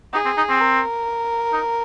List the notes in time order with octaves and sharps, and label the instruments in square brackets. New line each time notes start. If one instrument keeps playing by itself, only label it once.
[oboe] D#4 [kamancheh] G#4
[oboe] C4
D#4
C4
[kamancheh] A#4
[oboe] D#4